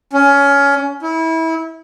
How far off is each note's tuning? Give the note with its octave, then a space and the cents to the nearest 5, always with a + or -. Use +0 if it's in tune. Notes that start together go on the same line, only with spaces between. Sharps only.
C#4 +20
E4 -25